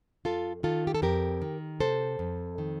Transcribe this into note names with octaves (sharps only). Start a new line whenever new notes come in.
F2 F4 A4
D#3 F4 A4
G4
A4
F2 G4 A#4
D#3
C3 A4 C5
F2
D#3